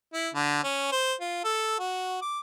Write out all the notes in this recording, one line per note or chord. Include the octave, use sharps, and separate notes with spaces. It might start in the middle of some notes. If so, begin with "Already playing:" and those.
E4
D3
C#4
C5
F4
A4
F#4
D6